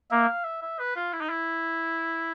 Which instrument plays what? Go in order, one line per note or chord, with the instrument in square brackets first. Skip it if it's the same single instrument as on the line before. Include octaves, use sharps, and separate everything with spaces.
[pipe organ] A#3 [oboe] E5
[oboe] F5
E5
E5
B4
F4
E4
D#4
E4